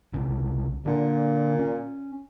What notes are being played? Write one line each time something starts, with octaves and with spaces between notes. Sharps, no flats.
C2 C#3
A#2 D3 D4
C#4